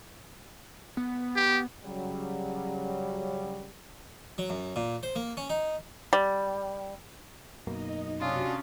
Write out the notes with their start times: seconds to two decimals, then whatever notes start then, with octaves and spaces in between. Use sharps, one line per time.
0.97 B3
1.36 G4
1.85 C#3 F#3 G3
4.38 F#3
4.50 F#2
4.76 A#2
5.03 C5
5.16 A#3
5.37 C#4
5.50 D#4
6.13 G3
7.67 F#2 B2 A#3 D#4 D#5
8.20 C3 C#4 D4 F4 F#4 D#6